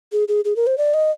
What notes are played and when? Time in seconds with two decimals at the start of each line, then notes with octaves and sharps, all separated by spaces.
0.12 G#4
0.28 G#4
0.45 G#4
0.56 A#4
0.67 C5
0.78 D5
0.94 D#5